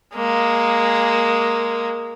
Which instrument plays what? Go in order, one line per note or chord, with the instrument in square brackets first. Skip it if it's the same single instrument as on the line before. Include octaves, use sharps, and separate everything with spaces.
[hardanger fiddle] G#3 A#3